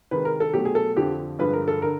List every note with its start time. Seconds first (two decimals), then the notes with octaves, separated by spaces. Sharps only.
0.11 C3 D#3 G#3 B4
0.25 A#4
0.40 A4
0.53 B2 F#3 A3 G4
0.65 G#4
0.75 A4
0.96 F2 D3 F3 G4
1.39 G2 D3 F3 G#3 B4
1.53 A#4
1.68 A4
1.82 D3 A#4